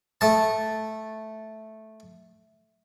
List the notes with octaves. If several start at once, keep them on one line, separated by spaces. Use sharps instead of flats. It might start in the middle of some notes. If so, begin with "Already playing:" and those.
A3 A5